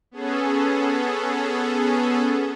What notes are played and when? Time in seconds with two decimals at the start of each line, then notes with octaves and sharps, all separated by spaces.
0.11 B3 C#4 G#4 A4